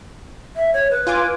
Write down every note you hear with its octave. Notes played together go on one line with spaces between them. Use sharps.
E5
C#5
B4
F4 G#5 D6